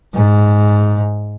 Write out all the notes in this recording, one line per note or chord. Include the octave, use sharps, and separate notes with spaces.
G#2